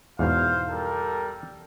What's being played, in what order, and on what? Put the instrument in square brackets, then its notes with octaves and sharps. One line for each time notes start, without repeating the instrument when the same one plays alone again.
[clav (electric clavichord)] E2 G#2 B2 [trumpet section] C5 F5
[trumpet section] G3 A4 A#4